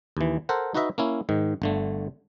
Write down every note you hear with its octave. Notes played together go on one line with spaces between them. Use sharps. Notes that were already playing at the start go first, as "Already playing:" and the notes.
D#2 E3
A4 A#4 C5 F#5
D#4 F#4 B4 D#5 E5
A#3 C#4 E4
G#2 D#3
G1 D3 A3